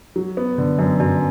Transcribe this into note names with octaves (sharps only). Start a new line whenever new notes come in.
F#3
B3
D3
F#2
F#2